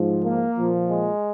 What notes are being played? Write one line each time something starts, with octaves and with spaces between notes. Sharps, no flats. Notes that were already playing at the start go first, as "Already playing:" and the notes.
Already playing: G#2 F3
A#3
A#2 F3
G#3